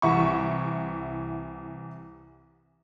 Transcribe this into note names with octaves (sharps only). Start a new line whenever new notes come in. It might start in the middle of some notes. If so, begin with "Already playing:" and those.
C2 E3 E5 F#5 C#6